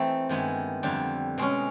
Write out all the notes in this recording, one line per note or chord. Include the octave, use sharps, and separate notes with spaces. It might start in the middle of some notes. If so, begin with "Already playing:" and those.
Already playing: E3 A3 C4 D#4
G2 D#3 G#3 B3 E4
F2 D3 G3
B2 G#3 C#4